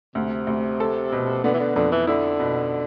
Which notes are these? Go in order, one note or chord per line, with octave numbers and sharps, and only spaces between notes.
D2 C3
D2
A4
B2
D3 B3
E3
D3
F2 D3
E3
D3 E4
B2